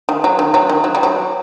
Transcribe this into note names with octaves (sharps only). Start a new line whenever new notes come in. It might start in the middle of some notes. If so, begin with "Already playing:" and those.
D#3
F#3
D#3
F#3
D#3
F#3
G3
F#3